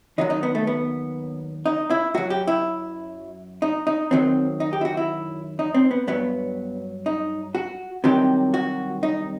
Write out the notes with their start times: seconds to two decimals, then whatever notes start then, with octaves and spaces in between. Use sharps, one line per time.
0.18 D#2 D#3 F#3 D#4
0.30 D#4
0.43 B3
0.55 A3
0.67 B3
1.66 D#4
1.90 E4
2.14 F#2 F#3 F#4
2.30 G4
2.47 E4
3.62 D#4
3.87 D#4
4.11 F#2 D#3 F#3 C4
4.60 D#4
4.73 G4
4.81 E4
4.85 F#4
4.97 E4
5.59 D#4
5.74 C4
5.91 B3
6.07 G2 F#3 B3
7.06 D#4
7.55 F#4
8.04 C2 C3 D#3 F#3 G4
8.54 F#4
9.03 D#4